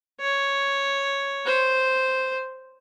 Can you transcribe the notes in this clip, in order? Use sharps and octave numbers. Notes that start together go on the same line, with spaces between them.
C#5
C5